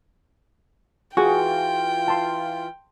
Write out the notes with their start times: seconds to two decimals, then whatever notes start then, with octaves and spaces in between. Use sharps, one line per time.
1.17 E3 F4 F#4 G#4 G5 G#5 C#6
2.08 A5 C6